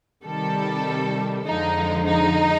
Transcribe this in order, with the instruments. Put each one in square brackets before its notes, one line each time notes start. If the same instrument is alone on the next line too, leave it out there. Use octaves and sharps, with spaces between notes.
[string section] C3 D#3 G3 A4
F2 D3 F3 G#3 D#4
D#4